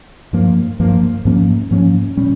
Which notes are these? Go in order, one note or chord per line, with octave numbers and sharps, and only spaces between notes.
G2 F3 A#3
G2 F3 A#3
G#2 F3 A#3 C#4
G#2 F3 A#3 C#4
A#2 G3 C#4